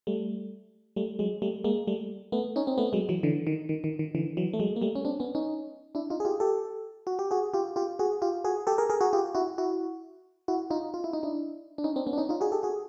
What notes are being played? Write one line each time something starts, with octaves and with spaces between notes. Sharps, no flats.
G3 A3
G3 A3
F#3 G#3
G3 A3
G#3 A#3
G3 A3
A3 B3
C#4 D#4
C4
A3 B3
F#3 G#3
E3 F#3
D3 E3
D#3
D#3
D#3
D#3
D3 E3
E3 F#3
A3
F#3 G#3
A#3
G3 A3
C#4
C4 D4
B3 C#4
C#4 D#4
D4 E4
D#4 F4
G#4
F4 G4
G4 A4
F#4
G4
F#4 G#4
F4 G4
F4 G4
F#4 G#4
F4 G4
F#4 G#4
G4 A4
G#4 A#4
G#4 A#4
F#4 G#4
F4 G4
E4 F#4
E4 F#4
E4 F#4
D#4 F4
F4
E4
D#4
D4 E4
D4
C#4 D#4
C4 D4
B3 C#4
D4
C#4 D#4
D#4 F4
F#4 G#4
G4 A4
F#4 G#4